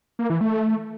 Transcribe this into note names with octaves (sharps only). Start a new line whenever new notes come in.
A#3
E3
A3